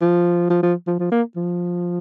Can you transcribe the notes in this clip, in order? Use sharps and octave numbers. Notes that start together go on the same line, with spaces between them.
F3
F3
F3
F3
F3
A#3
F3